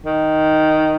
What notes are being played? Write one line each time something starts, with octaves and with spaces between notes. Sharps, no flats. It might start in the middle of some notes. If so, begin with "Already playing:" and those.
D#3